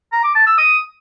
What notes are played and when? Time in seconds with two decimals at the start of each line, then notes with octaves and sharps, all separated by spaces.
0.12 A#5
0.24 D6
0.35 A5
0.47 E6
0.58 D#6